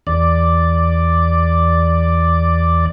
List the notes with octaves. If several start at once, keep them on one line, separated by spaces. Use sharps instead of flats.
E2 D5